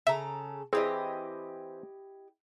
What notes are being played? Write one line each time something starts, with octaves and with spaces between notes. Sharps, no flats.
C#3 A4 E5 A#5
E3 C4 E4 G4 G#4 D#5